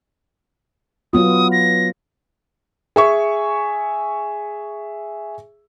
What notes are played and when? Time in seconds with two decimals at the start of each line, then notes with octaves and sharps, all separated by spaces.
1.13 F#3 B3 F4 D#6
1.52 A#6
2.96 G#4 E5 C#6